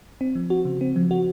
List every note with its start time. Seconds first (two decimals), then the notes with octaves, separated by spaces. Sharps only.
0.21 C4
0.35 F3
0.50 F#4
0.65 C#3
0.81 C4
0.96 F3
1.11 F#4